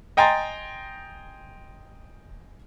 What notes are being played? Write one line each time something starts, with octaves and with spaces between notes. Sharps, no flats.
D#5 G5 G#5 A#5 C6 A6